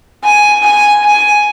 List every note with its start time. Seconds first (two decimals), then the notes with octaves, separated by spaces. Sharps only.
0.24 G#5
0.63 G#5
1.04 G#5